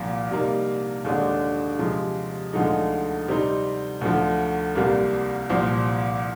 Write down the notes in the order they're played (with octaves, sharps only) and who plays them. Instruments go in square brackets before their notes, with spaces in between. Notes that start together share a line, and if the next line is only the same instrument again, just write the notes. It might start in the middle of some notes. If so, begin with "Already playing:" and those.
Already playing: [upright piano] C2 A#2 F3
C3 G3 A#3 D#4
D#2 D3 G#3 D4
C3 F3 G#3
D2 D3 F3 G#3 D#4
C3 G3 C4 D#4
D2 D3 F3
C2 C3 G3 A#3
C2 A#2 F3 C4